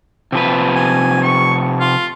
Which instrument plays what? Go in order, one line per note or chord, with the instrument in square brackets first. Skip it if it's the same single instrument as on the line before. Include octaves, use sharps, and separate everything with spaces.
[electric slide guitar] C3 F3 B4
[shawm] G#5
C#6
F4